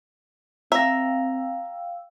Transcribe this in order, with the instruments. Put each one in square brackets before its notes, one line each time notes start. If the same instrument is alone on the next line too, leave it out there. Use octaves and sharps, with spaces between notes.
[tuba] C4 [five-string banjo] E5 [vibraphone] F5 G5 E6 [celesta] A#5 A#6